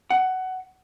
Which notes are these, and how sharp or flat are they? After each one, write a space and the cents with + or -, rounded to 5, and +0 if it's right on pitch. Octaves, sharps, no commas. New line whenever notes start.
F#5 +15